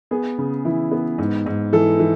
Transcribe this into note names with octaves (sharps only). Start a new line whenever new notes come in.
B3 G#4
C#3
E3 E4
B3
G#2
G#2
E3 A4
E3